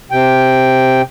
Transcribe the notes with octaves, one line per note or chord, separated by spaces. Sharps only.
C3 G5